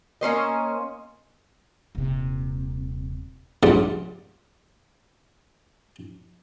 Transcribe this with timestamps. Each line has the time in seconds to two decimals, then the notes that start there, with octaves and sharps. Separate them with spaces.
0.21 A#3 C#4 C5 D#5
1.95 D#1 C3
3.63 C#2 G2 F4 D5 F#5 A5